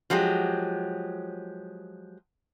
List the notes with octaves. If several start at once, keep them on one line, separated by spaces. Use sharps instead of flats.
F3 F#3 G#3 G4